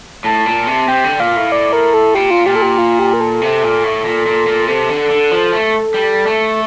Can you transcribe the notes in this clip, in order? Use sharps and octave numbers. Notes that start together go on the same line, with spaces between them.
A2 A5
A#2
C3
C3 G5
D3
A#2 F5
A2
D5
A#4
A4
A#2 G4
F4
A#2 G4
A4
G4
F4
G4
A#4
A4
C3
A#2
A2
A#2
A#2
A#2
C3 A4
D3
D3
F3
A3
G3
A3